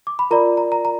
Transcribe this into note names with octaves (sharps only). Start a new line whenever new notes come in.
D6
B5
F4 A#4 D5 A#5
A#5
A#5
A#5